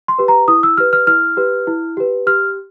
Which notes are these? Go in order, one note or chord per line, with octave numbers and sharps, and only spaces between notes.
C6
G4 B4
A#5
E4 D#6
E6
G4 B4 F6
F6
E4 F6
G4 B4
E4
G4 B4
G4 F6